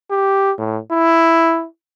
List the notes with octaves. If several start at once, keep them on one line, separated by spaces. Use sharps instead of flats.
G4
A2
E4